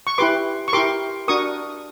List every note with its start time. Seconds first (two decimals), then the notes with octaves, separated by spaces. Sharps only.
0.07 C#6
0.18 E4 G4 B4 C6 D6
0.68 C#6
0.73 E4 G4 A#4 C6 D6
1.28 D4 F#4 A#4 C#6 D#6